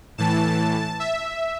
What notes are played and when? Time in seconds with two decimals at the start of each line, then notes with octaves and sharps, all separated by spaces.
0.18 A2 E3 A5
1.00 E5